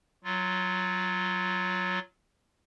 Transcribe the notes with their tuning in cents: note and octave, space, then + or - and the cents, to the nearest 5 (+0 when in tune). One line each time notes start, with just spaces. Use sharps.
F#3 +0 F4 +0